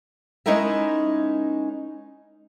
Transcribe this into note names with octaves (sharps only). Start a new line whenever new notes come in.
G#3 C#4 D#4 E4 A#4 E5